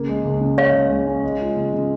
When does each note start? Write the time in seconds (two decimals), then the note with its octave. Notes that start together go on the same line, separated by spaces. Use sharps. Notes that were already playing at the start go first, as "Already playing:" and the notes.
Already playing: C#3 A#3
0.09 G#3
0.25 C#2
0.41 C#3
0.58 G#3 C#5 F5
0.74 C#2
0.90 G#3
1.07 C#4
1.24 G#3
1.40 F4
1.56 C#3
1.73 C#3